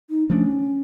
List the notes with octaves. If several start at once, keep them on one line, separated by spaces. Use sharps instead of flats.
D#4
F3 A3 C#4 D4